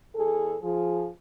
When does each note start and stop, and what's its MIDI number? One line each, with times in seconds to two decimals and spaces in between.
0.15 0.56 40
0.15 0.56 68
0.15 0.56 69
0.62 1.07 53
0.62 1.07 68